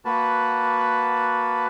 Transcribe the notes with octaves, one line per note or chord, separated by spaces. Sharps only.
A#3 F#4 B4 A5